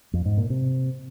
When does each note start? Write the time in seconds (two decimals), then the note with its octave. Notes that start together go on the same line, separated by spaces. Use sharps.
0.13 F2
0.25 G#2
0.37 A#2
0.50 C3